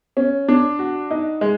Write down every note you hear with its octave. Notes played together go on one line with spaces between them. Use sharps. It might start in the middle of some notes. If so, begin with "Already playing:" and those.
C#4
D4
F#4
D#4
G#3